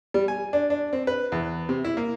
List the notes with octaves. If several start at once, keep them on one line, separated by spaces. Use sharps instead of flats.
G3
G#5
D4
D4
C4
B4
E2
C3
E4
A#3